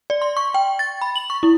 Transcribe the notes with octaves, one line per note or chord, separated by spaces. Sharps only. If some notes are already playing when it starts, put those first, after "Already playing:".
D5
C6
C#6
G5
A6
B5
F#7
C#6
E4